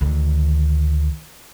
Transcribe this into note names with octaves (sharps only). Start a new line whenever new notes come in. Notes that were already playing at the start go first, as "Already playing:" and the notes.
D2 D#3